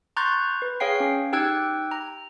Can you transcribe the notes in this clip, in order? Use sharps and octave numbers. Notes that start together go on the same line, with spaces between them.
A#5 C6 C#6 F#6 G6 A6
B4
G#4 C#5 F5 G5 C7
C#4
D#4 G4 G5 E6 F#6 G#6
A#5